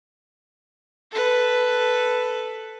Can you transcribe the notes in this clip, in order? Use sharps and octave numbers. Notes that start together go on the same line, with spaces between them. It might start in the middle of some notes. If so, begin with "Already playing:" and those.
A4 B4